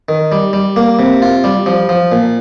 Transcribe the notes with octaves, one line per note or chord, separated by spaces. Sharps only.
D#3
G3
G3
A#3
C3
F4
G3
F3
F3
A#2